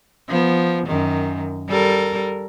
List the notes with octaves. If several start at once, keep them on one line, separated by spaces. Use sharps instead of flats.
F3 B3
F#2 D#3
G3 A4 A#4